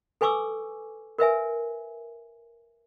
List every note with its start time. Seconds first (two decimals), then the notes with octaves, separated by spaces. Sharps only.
0.21 A4 B4 G#5 C#6 D6 E6
1.19 A#4 B4 E5 G#5